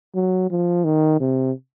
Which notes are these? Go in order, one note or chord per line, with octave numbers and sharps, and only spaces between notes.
F#3
F3
D#3
C3